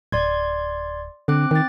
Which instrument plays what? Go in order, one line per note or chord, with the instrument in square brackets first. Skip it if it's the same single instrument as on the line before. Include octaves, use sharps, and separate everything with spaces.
[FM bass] D1 [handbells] D5 C6 G#6
[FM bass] D3 [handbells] C4 D6 F#6
[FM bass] D#3 [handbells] G5 A6